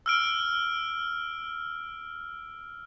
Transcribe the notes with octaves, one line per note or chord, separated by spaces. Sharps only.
E6 F6 D7